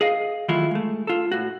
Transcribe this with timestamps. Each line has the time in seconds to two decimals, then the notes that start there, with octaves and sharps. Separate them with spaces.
0.01 G#4 D#5 F5
0.49 D#3 E3 F#3 A3 E4 F4
0.71 G#3 A3
1.07 F4 A4
1.32 A2 F#4